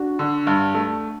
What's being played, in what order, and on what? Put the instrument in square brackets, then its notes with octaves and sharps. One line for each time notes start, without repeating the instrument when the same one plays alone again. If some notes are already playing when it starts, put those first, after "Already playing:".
Already playing: [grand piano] D4 F#4
[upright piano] D3
G2
A3